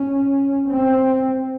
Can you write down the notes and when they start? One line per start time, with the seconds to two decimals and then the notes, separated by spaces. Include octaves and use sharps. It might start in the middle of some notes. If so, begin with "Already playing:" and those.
Already playing: C#4
0.69 C4